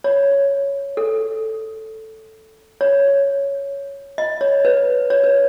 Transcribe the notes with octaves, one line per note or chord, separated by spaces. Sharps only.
C#5
A4
C#5
D#5
C#5
B4
C#5
B4